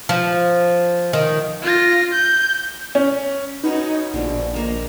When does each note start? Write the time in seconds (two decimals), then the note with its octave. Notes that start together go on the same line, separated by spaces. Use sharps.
0.09 F3
1.13 D#3
1.62 F4 A#6
2.13 G6
2.95 C#4
3.64 C#4 D#4 F#4 B4
4.14 A#1 D#2 B2 D3
4.54 D#3 A#3 A#5